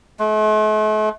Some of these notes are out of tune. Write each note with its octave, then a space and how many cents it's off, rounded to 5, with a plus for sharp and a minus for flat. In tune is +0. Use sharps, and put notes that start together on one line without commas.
A3 -45